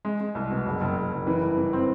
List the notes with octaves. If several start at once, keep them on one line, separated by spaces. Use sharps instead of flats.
G#3
G#3
C2
B2
F#1
F#1
F#1
F#1
E3
G2
E3
C4